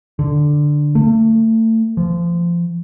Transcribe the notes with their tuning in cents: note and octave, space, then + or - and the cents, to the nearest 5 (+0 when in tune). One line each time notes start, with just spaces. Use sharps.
D3 +5
A3 +30
F3 -25